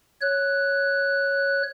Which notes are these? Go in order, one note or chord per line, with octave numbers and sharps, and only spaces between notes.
C#5 F#6